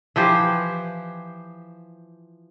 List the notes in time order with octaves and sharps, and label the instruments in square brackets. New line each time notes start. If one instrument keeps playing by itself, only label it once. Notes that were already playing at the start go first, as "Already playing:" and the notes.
[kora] E3 F3 G4 C5